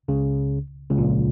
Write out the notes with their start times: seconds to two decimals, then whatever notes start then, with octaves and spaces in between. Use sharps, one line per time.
0.08 C#2 C#3
0.90 C#2 C#3
0.98 A#1 A#2